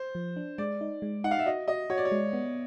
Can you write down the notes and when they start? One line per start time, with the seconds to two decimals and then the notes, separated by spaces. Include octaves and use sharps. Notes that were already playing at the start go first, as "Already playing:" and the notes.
Already playing: C5
0.15 F3
0.36 D4
0.58 G#3 D5
0.81 D#4
1.02 G#3
1.24 D#4 F#5
1.31 F5
1.39 E5
1.46 F#4 D#5
1.68 F#4 D#5
1.90 F#4 C#5
1.97 D5
2.05 C#5
2.12 G#3
2.33 B3